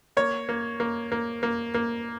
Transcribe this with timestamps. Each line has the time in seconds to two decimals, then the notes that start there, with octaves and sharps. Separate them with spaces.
0.17 A#3 C#5
0.49 A#3
0.80 A#3
1.12 A#3
1.43 A#3
1.74 A#3